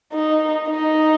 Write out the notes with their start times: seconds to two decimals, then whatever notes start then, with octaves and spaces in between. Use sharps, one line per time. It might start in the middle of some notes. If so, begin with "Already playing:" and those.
0.13 D#4
0.68 D#4